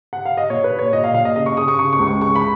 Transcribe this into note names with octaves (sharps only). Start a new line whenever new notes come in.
F#5
F5
D#5
A#2 C#5
B4
A#2
C#5
A#2 D#5
F5
A#2 F5
D#5
C#3 D#5
C#6
C#3 D#6
C#6
C#3 C#6
C#6
C#2
C#6
C#3 C#6
B5